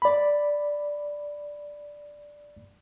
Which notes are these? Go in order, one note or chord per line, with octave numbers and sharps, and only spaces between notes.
D5 B5